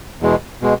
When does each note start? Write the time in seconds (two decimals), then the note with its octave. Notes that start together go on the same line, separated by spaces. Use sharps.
0.21 E2 B2 G#3
0.61 B2 G#3